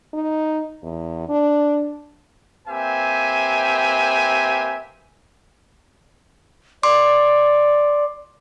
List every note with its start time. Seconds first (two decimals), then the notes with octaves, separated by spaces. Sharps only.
0.14 D#4
0.83 E2
1.29 D4
2.68 A#3 C4 G4 B4 E5 G#5
6.83 D5 C6 D6